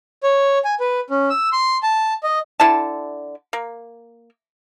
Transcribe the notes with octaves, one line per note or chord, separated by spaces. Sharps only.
C#5
G#5
B4
C#4
E6
C6
A5
D#5
D3 E4 A5
A#3